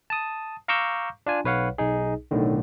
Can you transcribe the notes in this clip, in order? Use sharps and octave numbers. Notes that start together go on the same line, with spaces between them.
A5 D#6
F5 A#5 C#6 D6 E6 G6
D4 F4 G#5
B1 B4 C#5 F5 F#5
B1 D#4 G#4
B1 A2 D3 D#3